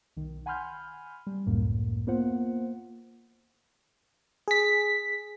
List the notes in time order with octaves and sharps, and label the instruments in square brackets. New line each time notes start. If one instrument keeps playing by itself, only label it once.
[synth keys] B1 D#3
F#5 G#5 B5 C6 F6 G6
G3
C#2 F#2 A2 A#3
A#3 B3 F4 C5 F#5
[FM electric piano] G#4 B6